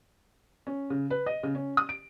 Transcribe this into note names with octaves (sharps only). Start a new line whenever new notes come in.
C#4
C#3
B4
D#5
C#3
C#4
D#6
D7